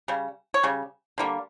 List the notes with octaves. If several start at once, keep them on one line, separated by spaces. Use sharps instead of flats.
C#3 G3
C#5
C#3 G3
D3 G3 A#3